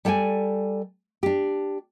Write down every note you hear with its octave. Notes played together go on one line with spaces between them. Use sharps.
G3 A4 D5 G5 G#5
D4 G4